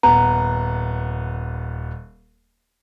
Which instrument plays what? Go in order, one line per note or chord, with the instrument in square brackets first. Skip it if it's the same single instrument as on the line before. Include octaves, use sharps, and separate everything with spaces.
[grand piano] D#1 B3 [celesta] A#5